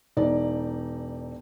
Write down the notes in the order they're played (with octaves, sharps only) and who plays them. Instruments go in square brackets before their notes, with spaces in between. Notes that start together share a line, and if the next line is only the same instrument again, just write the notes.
[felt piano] E1 D#4 D5